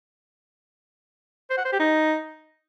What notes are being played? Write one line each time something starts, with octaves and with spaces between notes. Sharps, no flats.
C5
F#5
C5
G4
D#4